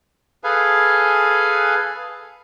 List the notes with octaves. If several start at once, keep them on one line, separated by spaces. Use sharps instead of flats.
G#4 A4 B4 F5 G#5